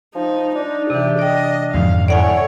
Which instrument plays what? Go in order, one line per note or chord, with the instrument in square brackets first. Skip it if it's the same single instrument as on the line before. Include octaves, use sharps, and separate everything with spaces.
[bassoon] F3 [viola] D#4
[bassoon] D4 [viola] D#4
[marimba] C3 E3 [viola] G4
[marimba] D5 G5 [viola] D#5
[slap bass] F2 G#2 D3 [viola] F5
[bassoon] A2 [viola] A4 C#5 [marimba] D5 F#5 G#5